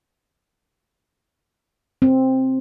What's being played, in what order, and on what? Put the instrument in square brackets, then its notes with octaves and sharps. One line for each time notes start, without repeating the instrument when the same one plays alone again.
[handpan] C4